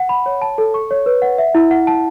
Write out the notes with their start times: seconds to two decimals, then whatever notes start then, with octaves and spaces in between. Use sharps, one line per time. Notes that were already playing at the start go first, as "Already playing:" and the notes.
Already playing: F#5
0.09 B5
0.26 C#5
0.42 A5
0.58 A4
0.74 C#6
0.91 C#5
1.06 B4
1.22 F#5
1.38 E5
1.55 E4
1.71 F#5
1.87 A5